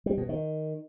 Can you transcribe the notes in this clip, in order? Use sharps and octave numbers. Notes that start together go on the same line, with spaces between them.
G3
B2
D#3